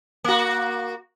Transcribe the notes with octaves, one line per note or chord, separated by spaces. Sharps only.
A#3 F#4